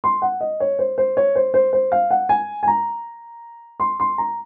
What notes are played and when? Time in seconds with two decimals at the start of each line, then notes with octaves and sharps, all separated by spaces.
0.04 C6
0.22 F#5
0.40 D#5
0.60 C#5
0.79 C5
0.98 C5
1.17 C#5
1.35 C5
1.54 C5
1.73 C5
1.92 F5
2.11 F#5
2.29 G#5
2.63 G#5
2.68 A#5
3.80 C6
4.00 C6
4.18 A#5